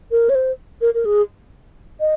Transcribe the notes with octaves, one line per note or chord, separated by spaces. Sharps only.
A#4
C#5
C5
A#4
A#4
G#4
D#5